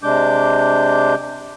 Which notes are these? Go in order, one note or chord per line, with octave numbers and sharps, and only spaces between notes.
C3 G#3 D4 D6 G6